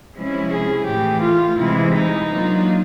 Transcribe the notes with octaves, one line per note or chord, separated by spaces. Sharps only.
C3 F3 G#3 C#4 E4
G#4
A2 E3 A3 G4
F4
C3 E3 G#3 E4
D#4
F#3 A#3 D4 F4